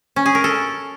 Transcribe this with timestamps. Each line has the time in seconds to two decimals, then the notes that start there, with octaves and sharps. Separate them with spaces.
0.16 C#4
0.26 G#4
0.35 A#4
0.44 A4